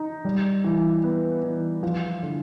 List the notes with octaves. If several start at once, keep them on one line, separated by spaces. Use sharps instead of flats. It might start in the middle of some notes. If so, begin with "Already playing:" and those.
Already playing: D#4
G3
E3
B3
E3
F3
D3